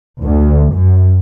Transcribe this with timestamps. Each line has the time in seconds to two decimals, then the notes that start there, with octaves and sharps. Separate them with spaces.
0.22 D2
0.72 F#2